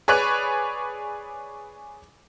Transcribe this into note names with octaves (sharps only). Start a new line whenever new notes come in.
G#4 B4 C#5 D5 C#6 F#6